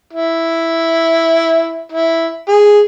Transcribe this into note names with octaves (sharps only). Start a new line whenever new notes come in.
E4
E4
G#4